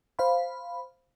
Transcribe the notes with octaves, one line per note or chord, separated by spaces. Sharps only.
C5 F5 B5